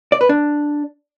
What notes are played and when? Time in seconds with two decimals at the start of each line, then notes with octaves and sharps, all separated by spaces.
0.12 D5
0.21 B4
0.29 D4